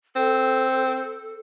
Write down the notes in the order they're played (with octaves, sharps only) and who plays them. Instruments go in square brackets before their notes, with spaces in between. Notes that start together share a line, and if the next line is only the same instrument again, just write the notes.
[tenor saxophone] C4 [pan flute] A4